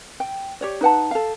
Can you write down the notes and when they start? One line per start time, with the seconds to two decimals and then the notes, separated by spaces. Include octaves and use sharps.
0.20 G5
0.61 G4 C#5 D5
0.81 D#4 B4 F#5 A5
1.11 A4 F5